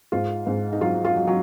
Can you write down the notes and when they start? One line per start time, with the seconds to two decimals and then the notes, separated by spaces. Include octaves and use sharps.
0.12 G#2 F4
0.47 G#2
0.73 D#4
0.81 F#3 F4
1.05 F4
1.16 F#3
1.27 F#3